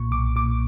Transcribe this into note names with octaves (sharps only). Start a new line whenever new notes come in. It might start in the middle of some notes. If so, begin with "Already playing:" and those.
Already playing: B1 A#2 C#6
B1 D6
A#2 D6